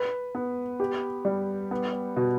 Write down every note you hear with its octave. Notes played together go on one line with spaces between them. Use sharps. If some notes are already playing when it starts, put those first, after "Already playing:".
Already playing: B4
B3
G4
G3
B3
B2